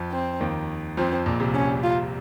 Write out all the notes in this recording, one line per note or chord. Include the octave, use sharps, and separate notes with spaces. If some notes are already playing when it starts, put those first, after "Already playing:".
Already playing: F2 F3
C4
D#2 D#3
F2 F3 C4
A#1 A#2
C2 C3
C#4
F4